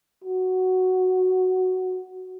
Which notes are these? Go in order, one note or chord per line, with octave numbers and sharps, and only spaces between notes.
F#4